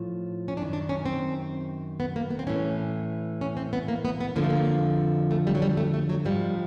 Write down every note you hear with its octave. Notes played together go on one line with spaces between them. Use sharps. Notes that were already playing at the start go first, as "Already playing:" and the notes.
Already playing: A2 F3
C#4
F#2 D#3 D4
D4
C#4
C4
B3
A#3
B3
C4
A2 E3 C#4
C#4
C4
B3
A#3
B3
B3
F2 D3 F3 A#3
A3
A#3
A3
G3
F#3
G3
A3
A3
F#3
G#2 F3 G3